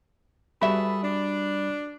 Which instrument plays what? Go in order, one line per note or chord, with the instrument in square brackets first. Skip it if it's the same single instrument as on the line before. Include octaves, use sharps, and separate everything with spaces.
[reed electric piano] G3 B5 [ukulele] F#4 E5 [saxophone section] G#4 A4 B4
[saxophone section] D4